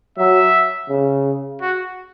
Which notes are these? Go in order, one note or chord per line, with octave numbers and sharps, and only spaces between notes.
F#3 E5
C#3
F#4